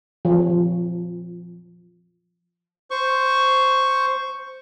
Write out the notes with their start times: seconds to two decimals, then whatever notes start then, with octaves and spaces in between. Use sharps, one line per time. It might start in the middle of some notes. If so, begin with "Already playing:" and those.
0.25 F3
2.91 C5 C#6